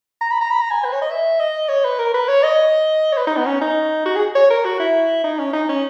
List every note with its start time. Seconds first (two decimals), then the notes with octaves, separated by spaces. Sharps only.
0.21 A#5
0.31 B5
0.41 A#5
0.51 B5
0.61 A#5
0.70 G#5
0.84 B4
0.93 C#5
1.01 D#5
1.10 E5
1.40 D#5
1.69 C#5
1.84 B4
1.98 A#4
2.14 B4
2.28 C#5
2.43 D#5
3.12 C#5
3.17 B4
3.27 D#4
3.36 B3
3.46 C#4
3.61 D#4
4.05 F#4
4.15 G#4
4.35 C#5
4.50 A#4
4.65 F#4
4.79 E4
5.24 D#4
5.39 C#4
5.53 D#4
5.69 C#4